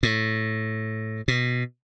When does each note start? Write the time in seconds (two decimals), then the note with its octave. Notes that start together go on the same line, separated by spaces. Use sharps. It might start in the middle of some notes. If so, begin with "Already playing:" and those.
0.03 A2
1.28 B2